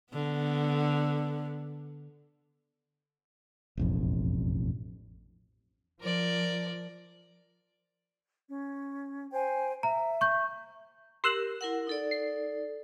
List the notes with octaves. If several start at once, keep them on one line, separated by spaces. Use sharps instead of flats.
D3 B3
E1 A1 F2
F3 A#4 D5
C#4
C5 G5 G#5
E5 A#5
C#6 G6
G4 A#4 C6 E6 F#6
E4 A#4 F#5
D#4 A4 D5
C7